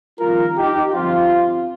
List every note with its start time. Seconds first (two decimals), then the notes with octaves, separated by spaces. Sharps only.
0.19 F2 D#3 G3 F4 A#4
0.57 D#4 G4
0.93 G1 F2 F3 C4 F4